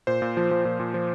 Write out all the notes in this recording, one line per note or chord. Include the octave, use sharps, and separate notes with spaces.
A#2 C5
A#2
F3
F3
A#2
A#2
F3